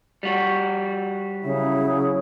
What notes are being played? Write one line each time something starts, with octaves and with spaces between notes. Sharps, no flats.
G3 F#4
C#3 F#3 E4